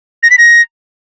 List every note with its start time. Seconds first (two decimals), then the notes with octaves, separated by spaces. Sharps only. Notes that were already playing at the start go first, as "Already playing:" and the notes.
0.23 A#6
0.30 B6
0.38 A#6